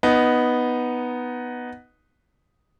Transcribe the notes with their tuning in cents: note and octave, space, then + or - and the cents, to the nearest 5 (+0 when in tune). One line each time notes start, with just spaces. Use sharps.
B3 +0 D#4 +0